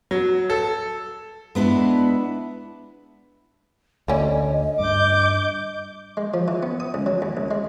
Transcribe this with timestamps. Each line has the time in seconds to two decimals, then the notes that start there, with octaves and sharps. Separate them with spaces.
0.11 F#3
0.50 A4
1.55 G#3 B3 D4 E4
4.08 D2 A3 C#4 D5 D#5
4.80 G2 D6 G6
6.17 G#3
6.34 F3
6.48 E3
6.63 B3
6.80 D#6
6.94 C#2
7.06 F#3
7.22 D#2
7.37 C2
7.51 G#3